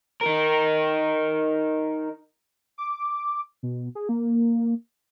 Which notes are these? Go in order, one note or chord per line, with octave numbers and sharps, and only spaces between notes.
D#4 A#4
D6
B2
G#4
A#3